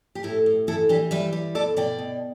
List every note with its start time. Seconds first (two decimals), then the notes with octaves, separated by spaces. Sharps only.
0.15 G4
0.23 A2 E4 A4
0.46 A2
0.67 E3 E4 A4
0.89 E3 D4 G4
1.11 G3 B4 E5
1.33 G3
1.55 B2 A4 D5
1.77 B2 D5 G5
1.98 B2